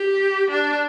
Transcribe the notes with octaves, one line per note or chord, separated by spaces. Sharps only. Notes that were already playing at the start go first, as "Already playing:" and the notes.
Already playing: G4
D4